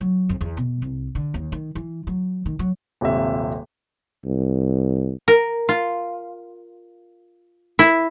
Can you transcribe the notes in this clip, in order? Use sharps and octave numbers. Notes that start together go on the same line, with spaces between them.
F#3
F2
E2
B2
C2
D3
D#2
D#3
E3
F#3
D#3
F#3
D#1 G#1 C3 E5
C2
A#4
F4
E4